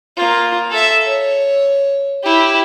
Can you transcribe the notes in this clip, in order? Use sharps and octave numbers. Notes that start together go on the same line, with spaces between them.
A#3 F4
A4 E5
C#5
E4 G4